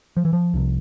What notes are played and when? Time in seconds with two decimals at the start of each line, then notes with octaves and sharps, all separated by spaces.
0.17 F3
0.25 E3
0.33 F3
0.53 C2 C3